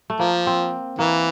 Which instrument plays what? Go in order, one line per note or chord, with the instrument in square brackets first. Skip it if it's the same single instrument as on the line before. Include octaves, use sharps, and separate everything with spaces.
[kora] A3
[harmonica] F3 [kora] A#3
[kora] C4
[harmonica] E3 [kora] A#3